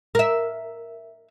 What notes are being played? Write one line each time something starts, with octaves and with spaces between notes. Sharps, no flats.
A#4 E5